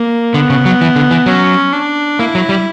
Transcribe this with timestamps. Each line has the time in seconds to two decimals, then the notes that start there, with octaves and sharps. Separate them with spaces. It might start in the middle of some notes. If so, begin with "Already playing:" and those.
Already playing: A#3
0.34 D3 B3
0.50 C#3
0.65 F#3
0.81 E3
0.96 D3
1.11 E3
1.26 F#3 C#4
1.73 D4
2.19 A#3 E4
2.35 F#3
2.49 G3